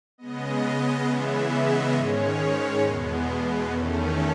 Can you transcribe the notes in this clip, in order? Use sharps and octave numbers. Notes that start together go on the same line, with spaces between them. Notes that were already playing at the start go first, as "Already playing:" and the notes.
C#3 G#3 B3 D#5
C#3 E3 G#3 B3 E5
D#5
G#2 D#3 G#3 C#4 C#5
C#5
E2 B2 G#3 B3
E2 D#3 A3 C#4